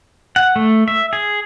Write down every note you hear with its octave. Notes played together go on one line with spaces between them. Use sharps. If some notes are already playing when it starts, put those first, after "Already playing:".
F#5
A3
E5
G#4